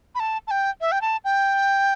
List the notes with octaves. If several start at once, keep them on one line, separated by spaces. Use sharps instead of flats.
B5
A5
A5
G5
E5
G5
A5
G5